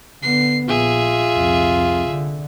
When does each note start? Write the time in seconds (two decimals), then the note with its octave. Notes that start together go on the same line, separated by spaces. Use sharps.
0.23 D3 B3 C7
0.68 A#1 F4 G#4 E5
1.32 C2 F2
2.10 D3